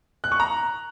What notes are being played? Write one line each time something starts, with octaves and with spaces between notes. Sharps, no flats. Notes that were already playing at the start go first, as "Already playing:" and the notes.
F#6
C#6
A#5